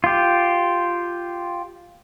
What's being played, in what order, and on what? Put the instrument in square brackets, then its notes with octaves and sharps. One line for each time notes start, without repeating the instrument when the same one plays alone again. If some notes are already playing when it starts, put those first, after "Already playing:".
[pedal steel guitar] F4 G4